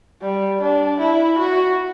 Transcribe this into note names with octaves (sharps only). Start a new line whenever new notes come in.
G3
D4
E4
F#4